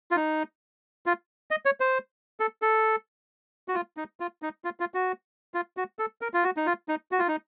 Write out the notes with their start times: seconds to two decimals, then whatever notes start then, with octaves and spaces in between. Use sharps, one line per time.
0.11 F4
0.16 D#4
1.06 F4
1.51 D#5
1.65 C#5
1.80 C5
2.40 A4
2.62 A4
3.68 F#4
3.74 F4
3.97 D#4
4.20 F4
4.42 D#4
4.65 F4
4.80 F4
4.94 F#4
5.54 F4
5.77 F#4
5.99 A4
6.21 A#4
6.34 F4
6.44 F#4
6.57 D#4
6.66 F4
6.89 D#4
7.12 F#4
7.19 F4
7.28 D#4